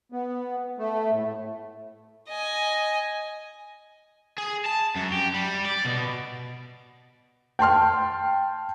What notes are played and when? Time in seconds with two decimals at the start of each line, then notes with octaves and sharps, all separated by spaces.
0.12 B3
0.78 A3
1.11 A2
2.29 D#5 G#5
4.38 G#4
4.65 A5
4.96 F#2
5.12 G4
5.34 G3
5.65 D5
5.85 B2
7.59 G5 A5 C6 F6